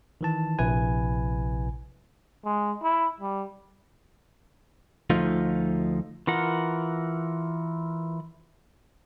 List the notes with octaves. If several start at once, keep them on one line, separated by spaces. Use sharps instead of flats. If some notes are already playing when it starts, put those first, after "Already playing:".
D#3 E3 A5
A#1 C3 E4 B4 G#5
G#3
E4
G3
D2 F3 A3 D#4 F4
E3 F4 A#4 F#5